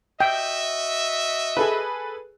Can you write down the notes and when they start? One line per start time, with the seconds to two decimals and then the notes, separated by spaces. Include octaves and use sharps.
0.20 F#4 D#5 E5 G5
1.57 G#4 A4 B4